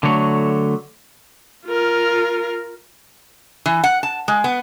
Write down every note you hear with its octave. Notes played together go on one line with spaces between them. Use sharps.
D3 F#3 A3 C#5
F4 A#4
E3
F#5
A5
G#3
B3